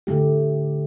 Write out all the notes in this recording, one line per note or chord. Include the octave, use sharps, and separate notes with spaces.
D3 A3 G4